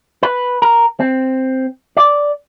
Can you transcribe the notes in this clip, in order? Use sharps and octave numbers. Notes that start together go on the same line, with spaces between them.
B4
A#4
C4
D5